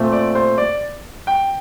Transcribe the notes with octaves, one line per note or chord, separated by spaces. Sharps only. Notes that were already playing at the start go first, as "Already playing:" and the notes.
Already playing: A#2 A3 C4
D5
C5
D5
G5